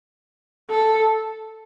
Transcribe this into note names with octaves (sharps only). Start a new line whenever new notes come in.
A4